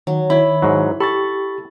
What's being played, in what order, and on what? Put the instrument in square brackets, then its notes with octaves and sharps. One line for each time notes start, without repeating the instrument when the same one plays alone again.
[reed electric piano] D#3 [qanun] F#3
[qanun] E4 [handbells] C#5 B5
[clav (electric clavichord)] G#2 F#3
[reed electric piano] G4 [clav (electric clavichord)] A4 [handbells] B5 C#6 A6